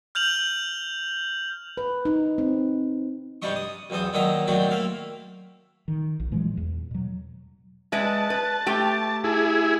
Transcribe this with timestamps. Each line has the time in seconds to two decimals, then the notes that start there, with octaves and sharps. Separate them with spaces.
0.15 F6 G6 F7 F#7
1.77 B4
2.05 D#4
2.38 C4
3.42 G2 C3 G3 D4 D#5 C#6
3.56 D#6
3.90 B1 E2 C4 A4 D#6
4.13 A#2 D#3 F#3 D#5 E5 A#5
4.47 A2 D#3 F#3 C4 D4 F#4
4.71 A#3 E5 F5
5.88 D#3
6.20 A#1
6.32 A#2 E3 F#3 G#3
6.57 E2
6.91 B2 F#3
7.92 G#3 B4 E5 A5
8.30 B4
8.66 A3 G4 G5
9.24 E4 G#4